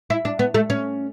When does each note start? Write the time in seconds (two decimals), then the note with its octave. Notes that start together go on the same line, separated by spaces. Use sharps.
0.10 E4
0.25 D4
0.39 B3
0.54 A3
0.70 C#4